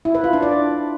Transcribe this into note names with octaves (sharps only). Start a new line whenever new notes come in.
E4
B4
F4
D4
D5